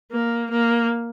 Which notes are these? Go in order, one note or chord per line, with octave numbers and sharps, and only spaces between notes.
A#3
A#3